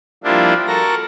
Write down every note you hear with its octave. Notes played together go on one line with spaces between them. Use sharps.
F3 G3 A#3 D4 E4 F4
F#4 A4 A#4 A#6